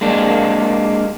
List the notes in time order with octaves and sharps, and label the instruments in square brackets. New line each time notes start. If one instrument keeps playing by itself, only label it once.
[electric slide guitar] G#3 A#3 D4